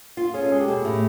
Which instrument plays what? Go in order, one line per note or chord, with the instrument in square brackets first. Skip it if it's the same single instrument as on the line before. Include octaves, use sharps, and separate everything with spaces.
[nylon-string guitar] F4
[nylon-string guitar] C#4 [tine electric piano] G#4
[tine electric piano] A4
[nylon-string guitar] G#3 [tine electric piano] G#4
[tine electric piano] G4
[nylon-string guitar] B2 [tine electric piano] A4
[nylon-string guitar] A2